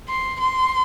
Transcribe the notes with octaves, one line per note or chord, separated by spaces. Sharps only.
C6
C6